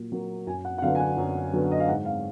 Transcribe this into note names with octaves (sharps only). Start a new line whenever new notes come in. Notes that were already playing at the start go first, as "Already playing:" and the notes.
Already playing: A#2 F#3 A#3
F#3 A#3
F#2 G#5
F#5
F#5
D3 F#3 B3 F5
G#5
F#5
F#2
D3 F#3 B3
D#5
F5
G#2 F#5
F5